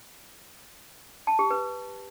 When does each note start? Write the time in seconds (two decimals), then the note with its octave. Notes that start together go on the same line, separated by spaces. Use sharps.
1.27 A5
1.39 G4
1.51 B4